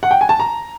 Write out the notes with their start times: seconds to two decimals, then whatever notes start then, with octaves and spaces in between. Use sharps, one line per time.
0.03 F#5
0.11 G5
0.21 G#5
0.29 A5
0.40 A#5